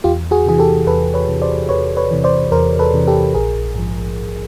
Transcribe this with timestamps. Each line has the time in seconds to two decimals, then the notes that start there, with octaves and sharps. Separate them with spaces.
0.04 E2 F4 G4
0.31 F#4 G#4
0.46 C3 E3 G#4
0.59 G4 A4
0.87 E2 A4 B4
1.14 B4 C#5
1.28 C3 E3
1.42 C5 D5
1.69 E2 B4 C#5
1.97 B4 C#5
2.11 C3 E3
2.24 C5 D5
2.52 E2 A#4 C5
2.79 A4 B4
2.94 C3 E3
3.07 G4 A4
3.34 A#1 G#4 A#4
3.75 G#2 F3
4.17 A#1